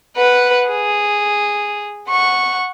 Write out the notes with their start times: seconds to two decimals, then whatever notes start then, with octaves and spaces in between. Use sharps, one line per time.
0.17 B4 F#5
0.69 G#4
2.09 F#5 C#6